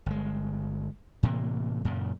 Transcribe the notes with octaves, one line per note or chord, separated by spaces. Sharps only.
G1 G#3
A2 C3 E3 A#3
F#2 A#2 C#3